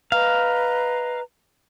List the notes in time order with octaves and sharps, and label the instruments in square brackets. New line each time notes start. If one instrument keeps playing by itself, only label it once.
[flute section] B4 D#5 A#5 [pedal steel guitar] F5